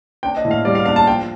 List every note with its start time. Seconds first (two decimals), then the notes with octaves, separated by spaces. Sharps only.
0.23 D4 G5
0.37 D#5
0.45 A2
0.51 F5
0.65 G3 D5
0.75 F5
0.85 D4 F5
0.96 A5
1.07 F3 G5